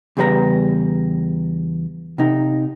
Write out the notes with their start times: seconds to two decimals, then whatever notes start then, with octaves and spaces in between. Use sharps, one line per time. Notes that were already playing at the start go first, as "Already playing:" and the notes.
0.17 E2 C#3 G3 A#4 B4 A#5
2.18 C3 D#4